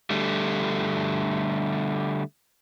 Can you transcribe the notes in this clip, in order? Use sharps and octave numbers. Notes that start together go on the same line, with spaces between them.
D3 G3 A3